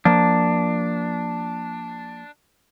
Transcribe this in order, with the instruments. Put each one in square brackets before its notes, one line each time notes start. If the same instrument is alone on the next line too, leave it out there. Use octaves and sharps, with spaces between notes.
[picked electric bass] F3 A#3 [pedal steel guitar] D4